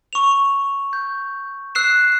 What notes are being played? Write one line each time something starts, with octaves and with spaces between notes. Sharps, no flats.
C#6 F7
G6
E6 F#6 C7 E7